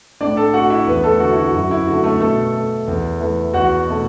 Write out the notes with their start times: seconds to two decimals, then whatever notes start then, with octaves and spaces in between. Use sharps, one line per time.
0.21 A2 D4 D5
0.37 A4 A5
0.54 A3 F#4 F#5
0.70 E4 E5
0.87 E2 B3 B4
1.04 A3 A4
1.20 D3 A3 F#4
1.33 E4
1.37 F#4
1.54 F#2 F#4
1.71 E4
1.87 D3 A3 F#4
2.04 A3 A4
2.20 B2 A3 A4
2.55 A3
2.88 E2
3.20 E3 A3
3.54 E2 F#4 F#5
3.87 B2 A3